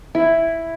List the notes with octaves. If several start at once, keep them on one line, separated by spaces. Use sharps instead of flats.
E4